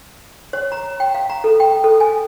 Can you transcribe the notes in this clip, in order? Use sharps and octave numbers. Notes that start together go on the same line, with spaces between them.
C#5
A#5
G5
F5
A#5
A4
G5
A4
G#5